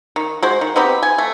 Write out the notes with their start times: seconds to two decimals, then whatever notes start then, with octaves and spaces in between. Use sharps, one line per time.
0.16 D#3
0.43 G#3 F#4 C5
0.61 D#3
0.76 B3 C4 D#4 G4
1.03 G#5
1.18 A3